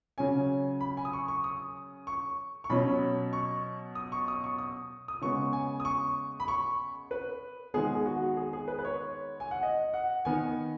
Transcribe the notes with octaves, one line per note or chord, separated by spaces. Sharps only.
C#3 F#3 C#4 G#5
B5
G#5
D#6
C#6
C#6
D#6
C#6
C#6
B2 F#3 C#4 B5
C#6
D#6
C#6
D#6
C#6
D#6
D#6
C#3 G#3 B3 C#6
G#5
D#6
C#6
B5
C#6
B4
D#3 G#3 B3 G#4
G#4
F#4
G#4
G#4
B4
B4
C#5
G#5
F#5
D#5
F#5
D#3 B3 G#5